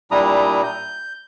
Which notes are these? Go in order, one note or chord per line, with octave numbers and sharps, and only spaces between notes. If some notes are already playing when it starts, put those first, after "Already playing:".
A#2 G3 D4 E4 A#5 D#6
G6